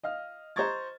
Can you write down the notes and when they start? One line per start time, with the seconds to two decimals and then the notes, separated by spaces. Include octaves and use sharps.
0.03 D#5 F5 F6
0.56 C5 D#5 A#5 C#6 G#6 A6